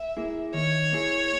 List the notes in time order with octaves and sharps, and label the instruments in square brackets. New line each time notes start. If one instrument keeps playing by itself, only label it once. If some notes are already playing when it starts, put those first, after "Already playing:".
Already playing: [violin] E5
[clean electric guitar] A#3 E4 G#4
[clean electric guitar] D#3 [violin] C#5
[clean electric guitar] A#3 E4 G#4